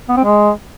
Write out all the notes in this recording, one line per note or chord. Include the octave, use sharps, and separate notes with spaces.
B3
C4
G#3